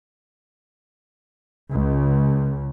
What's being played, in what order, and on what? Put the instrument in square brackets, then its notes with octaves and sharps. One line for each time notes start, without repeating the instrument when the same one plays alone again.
[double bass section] C#2